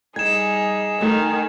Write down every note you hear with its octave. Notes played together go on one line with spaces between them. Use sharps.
G3 D#4 G#4 G#5 G#6 E7
D#3 A3 G#5